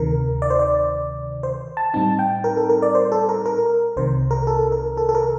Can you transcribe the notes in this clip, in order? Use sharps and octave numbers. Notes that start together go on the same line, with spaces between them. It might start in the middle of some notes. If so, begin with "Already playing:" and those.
Already playing: D2 C3 D#3 A#4
D5
C5
D5
C5
A5
A2 G3 C4 D#4 A5
G5
A#4
A4
A#4
D5
C5
A4
A#4
A#4
C2 C3 D#3 C5
A#4
A4
A#4
A4
A4
A#4